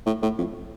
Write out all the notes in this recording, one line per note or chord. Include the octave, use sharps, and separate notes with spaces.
A2
A2
F2